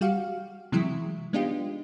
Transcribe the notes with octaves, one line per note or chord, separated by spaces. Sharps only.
G3 F#4 G4 F5
C3 E3 F#3 G#3 E4
G#3 B3 D4 D#4 F4 G4